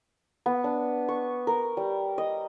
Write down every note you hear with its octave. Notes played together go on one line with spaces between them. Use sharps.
B3
D4
C#6
A#4
G3
D#5